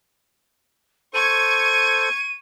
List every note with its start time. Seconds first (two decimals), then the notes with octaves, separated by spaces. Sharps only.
1.14 A4 C5 C#6 G#6 D#7